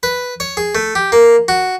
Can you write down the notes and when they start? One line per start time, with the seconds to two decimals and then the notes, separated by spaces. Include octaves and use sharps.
0.03 B4
0.40 C#5
0.57 G#4
0.75 A3
0.95 G4
1.12 A#3
1.48 F#4